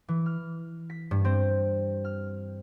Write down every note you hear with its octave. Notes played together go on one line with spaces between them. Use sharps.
E3
F6
B6
G2
C4
F6